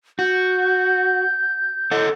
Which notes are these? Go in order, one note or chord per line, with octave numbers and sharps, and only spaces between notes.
F#4 G6
A4 D#5 F#5